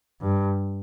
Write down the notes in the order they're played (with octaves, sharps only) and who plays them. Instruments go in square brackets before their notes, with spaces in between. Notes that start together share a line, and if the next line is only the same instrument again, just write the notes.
[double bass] G2